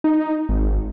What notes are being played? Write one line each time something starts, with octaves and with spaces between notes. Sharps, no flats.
D#4
G#1